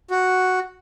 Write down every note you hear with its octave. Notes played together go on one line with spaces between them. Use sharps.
F#4